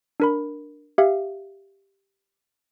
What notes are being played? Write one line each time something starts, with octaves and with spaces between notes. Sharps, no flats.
D4 A#4 B5
G4 E5 F5